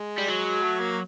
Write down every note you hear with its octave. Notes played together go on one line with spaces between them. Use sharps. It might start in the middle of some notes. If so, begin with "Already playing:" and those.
Already playing: G#3
G3
F#3
A3
A#3